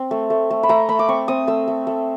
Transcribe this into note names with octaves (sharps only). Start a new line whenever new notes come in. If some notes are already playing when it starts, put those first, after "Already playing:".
Already playing: C4
A3
A3
A3
B5
A3 A#5
A3 B5
D6
C4 C#6
C4 D#6
A3 E6
A3
A3